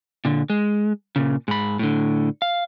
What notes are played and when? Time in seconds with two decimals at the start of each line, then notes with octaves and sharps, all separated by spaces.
0.25 A#2 D3
0.50 G#3
1.16 A#2 C#3
1.48 G#2 B5
1.79 A2 D3
2.42 F5